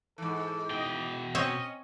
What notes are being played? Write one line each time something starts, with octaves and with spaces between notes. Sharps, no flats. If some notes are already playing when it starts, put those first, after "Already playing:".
G#2 E3 A4
B2 D#5 G5
C4 C#4 C5 C#5 D#5